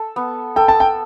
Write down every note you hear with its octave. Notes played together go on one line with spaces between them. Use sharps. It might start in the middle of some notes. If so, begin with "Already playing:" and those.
Already playing: A4
B3
A4 G5
A5
G5